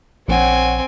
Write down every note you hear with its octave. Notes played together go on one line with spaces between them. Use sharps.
A#1 C4 C#5 F#5 G#5